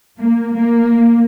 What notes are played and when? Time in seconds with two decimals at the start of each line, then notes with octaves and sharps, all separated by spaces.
0.22 A#3
0.55 A#3